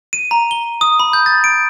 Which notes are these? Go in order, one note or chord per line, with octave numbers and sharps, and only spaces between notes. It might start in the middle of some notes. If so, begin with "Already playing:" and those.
D#7
A#5
G7
D#6
B5
G6
A6
D7